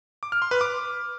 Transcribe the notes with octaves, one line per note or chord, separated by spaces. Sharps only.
D6
F6
C6
B4
D6